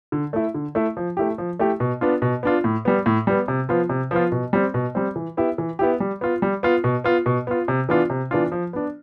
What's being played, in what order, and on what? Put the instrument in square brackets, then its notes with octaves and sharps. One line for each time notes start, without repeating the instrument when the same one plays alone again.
[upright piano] D3
A3 E4
D3
A3 E4
F3
A3 E4 G4
F3
A3 E4 G4
B2
B3 D4 F4
B2
B3 D4 F4
A2
G3 B3
A2
G3 B3
C3
F3 B3 F4
C3
F3 B3 F4
B2
G3 C4
B2
G3 C4
E3
B3 E4 G4
E3
B3 E4 G4
G3
B3 F4
G3
B3 F4
B2
B3 F4
B2
B3 F4
C3
E3 B3 D4 F4
C3
E3 B3 D4 F4
F3
B3 D4